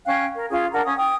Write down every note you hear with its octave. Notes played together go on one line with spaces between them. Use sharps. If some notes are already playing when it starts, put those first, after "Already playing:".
C#4 F5 G5 F#6
A#4
C#4 F4 G#4
D4 A#4 F#5 A#5
C#4 D#6
G5 D#6